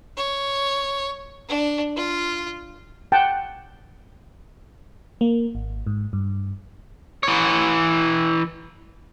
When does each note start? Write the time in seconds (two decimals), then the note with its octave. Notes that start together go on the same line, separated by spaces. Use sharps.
0.17 C#5
1.48 D4
1.96 F4
3.12 F#5 G5 A5
5.21 A#3
5.55 G#1
5.87 G#2
6.13 G2
7.23 E3 C#5